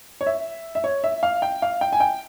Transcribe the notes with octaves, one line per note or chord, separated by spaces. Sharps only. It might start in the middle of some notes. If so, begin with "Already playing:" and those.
C#5
E5
E5
C#5
E5
F5
G5
F5
G5
G#5
G5